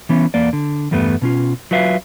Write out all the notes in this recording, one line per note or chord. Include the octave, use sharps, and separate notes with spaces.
E3 B3 C#4
E2 A#3 D5
D3
E2 G2 G3 A3 B3
B2 C#4 F4
F#3 F4 B4 E5 F5